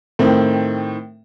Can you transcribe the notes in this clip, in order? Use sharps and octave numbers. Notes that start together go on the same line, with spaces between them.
A2 D#3 C4